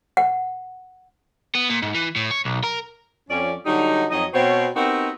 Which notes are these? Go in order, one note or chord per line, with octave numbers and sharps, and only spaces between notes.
F#5
B3
A#2
G#2
E3
A2
C#5
B1
A#4
F2 C#4 D5
D3 F#3 G3 D#4
F2 F#3 D#4 D#5
B2 C4 C#5
B3 C4 D#4 F#4 G4 A#4